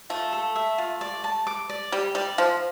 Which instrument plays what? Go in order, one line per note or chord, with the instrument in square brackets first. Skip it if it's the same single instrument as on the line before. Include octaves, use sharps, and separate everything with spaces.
[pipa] A3 [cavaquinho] F4
[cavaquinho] A4
E5
F4
D5
A5
D6
D5
[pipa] G3 [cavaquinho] G4
[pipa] G3 [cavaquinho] D5
[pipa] F3 [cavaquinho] F5